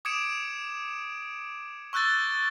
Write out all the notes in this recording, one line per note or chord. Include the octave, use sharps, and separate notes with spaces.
D6 D#6 G#6 C#7 D7 E7
C#6 E6 F#6 G6 A6 G7